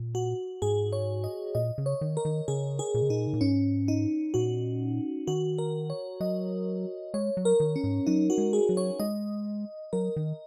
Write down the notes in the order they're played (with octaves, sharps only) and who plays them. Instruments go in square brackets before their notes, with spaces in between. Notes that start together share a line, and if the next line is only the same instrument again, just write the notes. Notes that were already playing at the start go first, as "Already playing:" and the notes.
Already playing: [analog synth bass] A#2
[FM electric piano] F#4
[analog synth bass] G#2 [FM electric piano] G#4
[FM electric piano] C#5
D#5
[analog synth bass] A#2 [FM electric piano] D#5
[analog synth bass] C#3
[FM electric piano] C#5
[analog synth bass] D#3
[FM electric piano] A#4
[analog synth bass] D#3
[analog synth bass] C#3 [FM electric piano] G#4
[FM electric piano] G#4
[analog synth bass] A#2
C#3
[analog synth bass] A#2 [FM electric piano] D#4
[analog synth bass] C#3
A#2
[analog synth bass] G#2 [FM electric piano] C#4
[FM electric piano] D#4
[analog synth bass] A#2 [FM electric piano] F#4
[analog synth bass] D#3 [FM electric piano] F#4
[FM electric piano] A#4
C#5
[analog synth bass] F#3 [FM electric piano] D#5
[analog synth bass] G#3 [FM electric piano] C#5
[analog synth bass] F#3
[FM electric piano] A#4
[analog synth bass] D#3
[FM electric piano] C#4
[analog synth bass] G#2
[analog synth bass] F#3 [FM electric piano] D#4
[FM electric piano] F#4
[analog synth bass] G#3
[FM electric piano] G#4
[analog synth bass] F#3
[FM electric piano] C#5
[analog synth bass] G#3 [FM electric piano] D#5
[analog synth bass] F#3 [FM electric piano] A#4
[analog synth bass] D#3